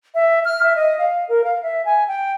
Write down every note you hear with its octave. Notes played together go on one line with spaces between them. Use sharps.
E5
F6
E5
D#5
F5
A#4
F5
E5
G#5
G5